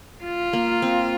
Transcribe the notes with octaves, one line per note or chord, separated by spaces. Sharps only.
F4
A#3
C4